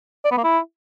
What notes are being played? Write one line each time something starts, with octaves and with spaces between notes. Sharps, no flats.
D5
B3
A#3
E4